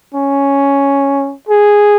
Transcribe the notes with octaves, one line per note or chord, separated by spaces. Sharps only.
C#4
G#4